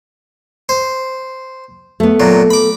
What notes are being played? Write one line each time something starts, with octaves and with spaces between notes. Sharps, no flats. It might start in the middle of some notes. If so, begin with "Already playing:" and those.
C5
A3 B3
A#2 F#3
B5 D6